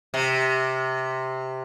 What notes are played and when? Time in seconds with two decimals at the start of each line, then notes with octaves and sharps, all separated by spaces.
0.14 C3